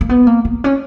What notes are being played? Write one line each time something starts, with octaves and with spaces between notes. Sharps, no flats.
A#3
B3
A#3
A#3
C#4